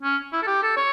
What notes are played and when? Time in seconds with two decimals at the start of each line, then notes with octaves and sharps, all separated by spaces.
0.03 C#4
0.33 E4
0.42 A4
0.47 G4
0.63 A4
0.77 C#5